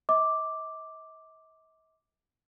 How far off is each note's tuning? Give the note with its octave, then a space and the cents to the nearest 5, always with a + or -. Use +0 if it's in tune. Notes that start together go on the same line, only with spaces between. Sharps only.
D#5 +45 D6 +0